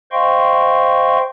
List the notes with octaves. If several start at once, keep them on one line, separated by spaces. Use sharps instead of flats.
C5 D#5 F5 G5 C6 C#6